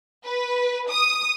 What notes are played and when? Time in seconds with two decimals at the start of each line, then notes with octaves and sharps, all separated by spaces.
0.25 B4
0.89 D#6